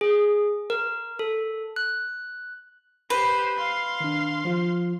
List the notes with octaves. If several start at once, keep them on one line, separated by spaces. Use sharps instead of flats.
G#4
A#4
A4
F#6
G4 B4 C5
F5 C6
D#3 D4
F3 F4